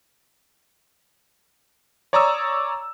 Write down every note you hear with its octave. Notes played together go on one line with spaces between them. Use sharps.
C#5 D5 A#5 C#6 D#6 E6